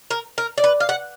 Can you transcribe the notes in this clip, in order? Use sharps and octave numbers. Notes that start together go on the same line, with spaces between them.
A#4
A#4
D5
B4
F5
F#5